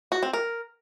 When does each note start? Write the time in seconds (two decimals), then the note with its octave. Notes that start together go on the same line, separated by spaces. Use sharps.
0.12 F#4
0.23 C4
0.33 A#4